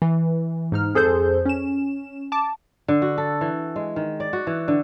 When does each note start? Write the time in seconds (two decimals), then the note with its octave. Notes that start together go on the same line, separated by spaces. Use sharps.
0.02 E3
0.72 G#2 D#4 F6
0.95 F2 G#4 A4 C5 G6
1.46 C#4 E7
2.32 A5 D6
2.88 D3
3.02 F#4
3.18 A4
3.41 E3
3.76 G#3
3.96 D#3
4.20 D5
4.33 F#4
4.47 E3
4.68 D3